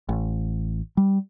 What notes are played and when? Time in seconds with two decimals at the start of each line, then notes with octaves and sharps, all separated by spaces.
0.09 A1
0.97 G3